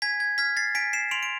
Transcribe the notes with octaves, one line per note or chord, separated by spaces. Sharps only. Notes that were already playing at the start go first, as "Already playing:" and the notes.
G#5 G#6 B6
G#6
F6 G#6 B6
A6 C7
G#5 B6 D7
C7 E7
C6 D7 F7
D7